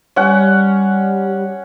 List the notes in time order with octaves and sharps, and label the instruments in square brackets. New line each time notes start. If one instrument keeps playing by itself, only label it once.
[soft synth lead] G3 [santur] C#4 F#5